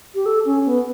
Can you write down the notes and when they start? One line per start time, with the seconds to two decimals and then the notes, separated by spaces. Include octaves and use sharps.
0.15 G4
0.26 A4
0.45 C#4
0.66 B3